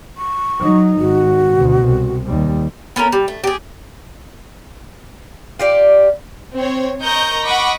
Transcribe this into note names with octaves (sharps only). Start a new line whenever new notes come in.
C#6
F#3 D#4
G#1 F#4
D2 B2
C2
D#2 G3
B3 C#4 A4 A#4
G3
A3
G4 G#4
F4 G4 D5
C4 C#5
A#4 D#5 A#5 C#6 G6
D#5 F#5 B5 C#6 D6